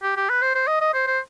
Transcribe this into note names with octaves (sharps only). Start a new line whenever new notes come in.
G4
G4
B4
C5
C5
D#5
D#5
C5
C5